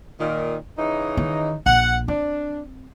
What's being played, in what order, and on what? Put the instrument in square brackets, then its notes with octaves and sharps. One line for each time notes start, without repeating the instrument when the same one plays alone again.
[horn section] A#2 D#3
C#3 E3 D#4
[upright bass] D#3
[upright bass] A#1 [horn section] F#5
[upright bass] C4 [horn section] D4